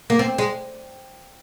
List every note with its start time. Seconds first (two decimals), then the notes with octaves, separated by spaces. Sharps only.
0.10 A#3
0.19 C4
0.38 G#3